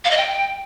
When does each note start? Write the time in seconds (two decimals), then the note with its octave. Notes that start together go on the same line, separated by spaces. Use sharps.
0.05 F5
0.11 D#5
0.17 G5